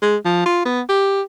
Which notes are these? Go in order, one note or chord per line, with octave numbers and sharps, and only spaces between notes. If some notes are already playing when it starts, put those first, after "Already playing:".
G#3
F3
F4
B3
G4